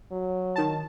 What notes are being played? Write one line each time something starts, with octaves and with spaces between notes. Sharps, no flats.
F#3
D#3 A5